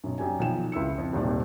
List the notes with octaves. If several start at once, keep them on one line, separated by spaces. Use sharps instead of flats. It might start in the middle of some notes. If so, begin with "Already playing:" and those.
B1 F#2
F#2 G4 D5 G#5
B1 D#3 F3 G5 G#5 E7
C#2 E4 E6 C#7
F2
D#1 G#1 D#2 C3 D5